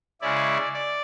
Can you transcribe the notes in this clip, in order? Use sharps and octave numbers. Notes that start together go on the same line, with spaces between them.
C#3 G#3 C#4 E4 D5
D5